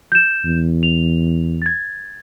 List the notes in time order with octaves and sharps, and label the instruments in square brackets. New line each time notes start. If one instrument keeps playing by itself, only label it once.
[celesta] G6 E7
[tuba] E2
[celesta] F7
G#6 A6